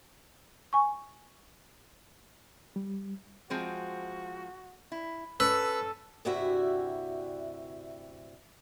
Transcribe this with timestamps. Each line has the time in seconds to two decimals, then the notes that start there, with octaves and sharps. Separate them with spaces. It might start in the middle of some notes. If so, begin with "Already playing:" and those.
0.73 G#5 C#6
2.76 G3
3.50 F3 G#3 C4 F#4
4.92 E4
5.40 C#4 A4 B4 E6
6.25 D2 G2 C3 E4 F#4 E5